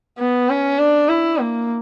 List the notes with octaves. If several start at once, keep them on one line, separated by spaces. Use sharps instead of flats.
B3
C#4
D4
E4
A#3